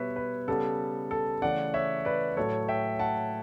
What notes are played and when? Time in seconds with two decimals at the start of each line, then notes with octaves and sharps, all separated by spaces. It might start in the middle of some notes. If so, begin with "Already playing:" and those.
Already playing: B2 G3 B3 B4 C#5 E5
0.16 B4
0.48 C#3 G3 B3 A4
1.11 A4
1.42 C#3 E3 A3 D5 F#5
1.74 C#5 E5
2.05 B4 D5
2.36 A2 F#3 A3 A4 C#5
2.69 E5 G5
2.99 F#5 A5